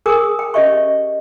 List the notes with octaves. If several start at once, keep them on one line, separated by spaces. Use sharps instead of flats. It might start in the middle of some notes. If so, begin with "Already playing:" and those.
G#4 A#4 G#5 D6 D#6
G5
C#4 G4 D#5 E5 C#6